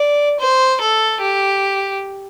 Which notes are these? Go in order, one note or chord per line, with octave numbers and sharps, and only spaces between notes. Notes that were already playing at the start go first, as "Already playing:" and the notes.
Already playing: D5
C5
A4
G4